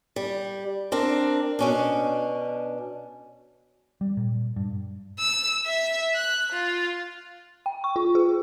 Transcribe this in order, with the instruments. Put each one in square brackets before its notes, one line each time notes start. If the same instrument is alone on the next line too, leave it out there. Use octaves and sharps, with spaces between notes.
[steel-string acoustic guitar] G3
C4 D4 A#4
B2 C#4 D4
[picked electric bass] G3
A#2
G2
[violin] E6
E5
F#6
F4
[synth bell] G5
C#6
F4
G#4